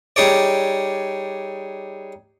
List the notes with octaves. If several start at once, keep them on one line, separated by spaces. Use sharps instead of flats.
G3 D#4 G#4 C#5 D5